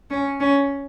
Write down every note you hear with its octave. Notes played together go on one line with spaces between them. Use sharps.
C#4
C#4